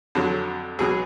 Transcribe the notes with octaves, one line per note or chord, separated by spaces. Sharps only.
F2 D3 F#3
C#2 B2 F#3 G#4